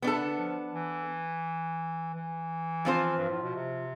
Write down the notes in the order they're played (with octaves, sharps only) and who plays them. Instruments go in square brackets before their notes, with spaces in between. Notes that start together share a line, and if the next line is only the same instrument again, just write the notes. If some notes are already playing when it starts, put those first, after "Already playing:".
[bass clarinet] C3 [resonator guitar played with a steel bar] B3 D4 A4
[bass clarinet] D3
F3
E3
E3
[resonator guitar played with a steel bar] F3 C4 F4 C5
[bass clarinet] G2
A2
B2
C3